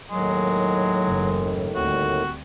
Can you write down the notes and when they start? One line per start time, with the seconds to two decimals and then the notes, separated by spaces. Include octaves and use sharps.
0.11 D#2 A2 D#3 F#3 G#3
1.07 F#1 G#2 E3
1.76 D2 G3 C4 F#4